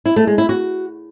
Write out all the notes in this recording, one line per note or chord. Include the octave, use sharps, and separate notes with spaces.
E4
A3
G#3
E4
F#4